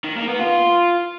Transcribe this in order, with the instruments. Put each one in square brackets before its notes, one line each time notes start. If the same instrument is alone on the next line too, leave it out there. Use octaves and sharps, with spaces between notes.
[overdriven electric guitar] D#3
A#3
B3
F4